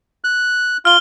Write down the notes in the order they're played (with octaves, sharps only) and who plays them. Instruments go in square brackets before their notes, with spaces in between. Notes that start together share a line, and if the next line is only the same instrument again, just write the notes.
[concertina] F#6
[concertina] F4 [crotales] F6 G7